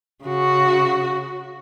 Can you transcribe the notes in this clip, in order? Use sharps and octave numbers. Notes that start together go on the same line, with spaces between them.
C#3 F#4